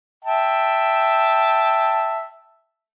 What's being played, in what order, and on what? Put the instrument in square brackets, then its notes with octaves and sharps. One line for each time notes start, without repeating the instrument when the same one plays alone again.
[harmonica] E5 G5 A5